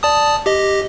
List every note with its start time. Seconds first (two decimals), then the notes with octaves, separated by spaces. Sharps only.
0.03 D5 A5 D#6
0.46 G4 D#5